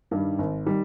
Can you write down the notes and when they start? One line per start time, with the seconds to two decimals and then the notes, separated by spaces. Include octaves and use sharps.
0.11 G2 D#3 G3
0.39 G#1
0.66 D#3 G3